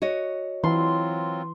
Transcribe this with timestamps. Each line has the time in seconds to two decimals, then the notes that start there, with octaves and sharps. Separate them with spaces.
0.02 F#4 C#5 D#5
0.64 E3 F#3 C4 F4 C6